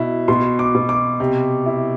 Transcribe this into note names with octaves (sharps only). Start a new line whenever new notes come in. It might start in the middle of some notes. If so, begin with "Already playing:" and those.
Already playing: B2 E4
B2 C6
D6
B2
D6
C3
E4